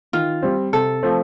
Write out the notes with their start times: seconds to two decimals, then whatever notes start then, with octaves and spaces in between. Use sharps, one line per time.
0.13 D#3 F4
0.42 G3 C4
0.73 C3 A4
1.03 F3 A3 C4